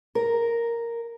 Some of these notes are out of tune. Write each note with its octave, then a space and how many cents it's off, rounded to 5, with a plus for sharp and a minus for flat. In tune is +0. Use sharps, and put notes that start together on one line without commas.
A#4 +0